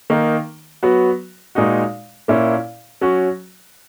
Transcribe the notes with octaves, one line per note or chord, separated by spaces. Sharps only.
D#3 A#3 D#4
F#3 B3 F#4
A#2 G#3 D#4 F#4
A#2 A#3 C#4 E4
F#3 C#4 F#4